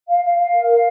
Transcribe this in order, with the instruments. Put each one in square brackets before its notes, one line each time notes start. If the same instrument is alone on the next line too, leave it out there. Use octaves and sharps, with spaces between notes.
[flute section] F5
F5
F5
A#4
F5